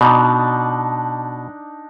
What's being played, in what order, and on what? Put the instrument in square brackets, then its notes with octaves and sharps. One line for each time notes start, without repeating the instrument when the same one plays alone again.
[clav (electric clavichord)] B2 [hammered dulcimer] D4 D#4